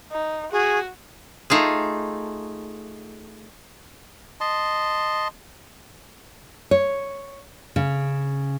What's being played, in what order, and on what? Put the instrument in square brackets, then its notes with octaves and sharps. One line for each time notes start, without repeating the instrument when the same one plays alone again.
[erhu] D#4
[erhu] F#4 [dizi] G#4
[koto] A3 D#4 F4 G#4
[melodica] D#5 A5 C6
[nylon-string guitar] C#5
C#3